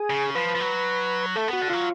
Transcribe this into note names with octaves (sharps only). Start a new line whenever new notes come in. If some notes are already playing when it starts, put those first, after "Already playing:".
Already playing: G#4
C#3
F3 B4
F3
F#3
A3 A4
B3
F#4
D3
F#3 F4